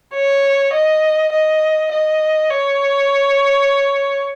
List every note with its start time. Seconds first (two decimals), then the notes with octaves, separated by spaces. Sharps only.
0.14 C#5
0.73 D#5
1.32 D#5
1.91 D#5
2.50 C#5